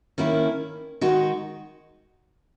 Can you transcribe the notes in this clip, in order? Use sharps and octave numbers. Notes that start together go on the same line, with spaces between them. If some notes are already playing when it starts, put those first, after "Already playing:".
D#3 A#3 C#4 E4
D#3 G#3 D#4 F#4